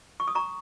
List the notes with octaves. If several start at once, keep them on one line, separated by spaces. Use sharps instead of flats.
C#6
D#6
A#5 C#6